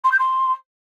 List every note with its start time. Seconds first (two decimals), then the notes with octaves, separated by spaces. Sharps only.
0.04 C6
0.12 G6
0.19 C6